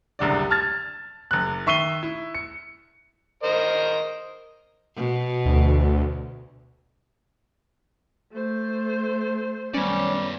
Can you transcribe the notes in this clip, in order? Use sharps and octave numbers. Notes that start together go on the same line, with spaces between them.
F#1 C2 D3 D5
A5 F6 G#6 A6
F#1 F#6
D#3 E5 C#6 C7 D#7 G7
E4
C#7
A#4 C5 D#5
B2
D2
A3 C5
G3 B3 C#4 D5